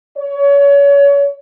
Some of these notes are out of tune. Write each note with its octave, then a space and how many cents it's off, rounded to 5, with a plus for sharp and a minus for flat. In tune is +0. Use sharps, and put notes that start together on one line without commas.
C#5 +30